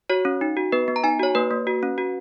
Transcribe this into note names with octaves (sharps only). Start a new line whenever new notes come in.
F#4 C#5
C#4
D#4
F#4
B3 B4
B3
A#5
D#4 G#5
F#4 C#5
A#3 B4
A#3
F#4
C#4
F#4